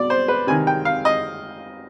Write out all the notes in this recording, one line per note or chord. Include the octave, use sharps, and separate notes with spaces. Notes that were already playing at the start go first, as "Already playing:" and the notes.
Already playing: B2 D5
C5
B4
C3 D#3 G#5
G5
F5
D#5